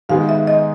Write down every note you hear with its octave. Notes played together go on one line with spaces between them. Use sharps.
G#2 D#3 G#3 B3 F5
E5
D#5